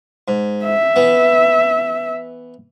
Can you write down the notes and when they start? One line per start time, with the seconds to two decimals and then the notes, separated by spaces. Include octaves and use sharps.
0.28 G#2
0.65 E5
0.96 E3 B3